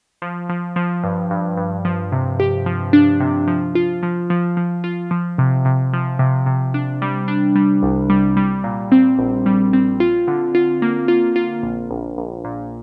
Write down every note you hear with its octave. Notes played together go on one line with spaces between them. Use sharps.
F3
F3
F3
G2
G2
G2
F3
C3
G4
F3
D4
C3
F3
F4
F3
F3
F3
F4
F3
C3
C3
F3
C3
C3
D4
G3
D4
G3
C2
G3
G3
A#2
C4
A#1
G3
C4
F4
D3
F4
A#3
F4
F4
A#1
A#1
A#1
A#2